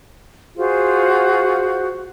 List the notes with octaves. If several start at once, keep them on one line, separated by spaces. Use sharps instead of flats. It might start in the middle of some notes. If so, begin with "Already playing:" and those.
F4 F#4 G#4 C5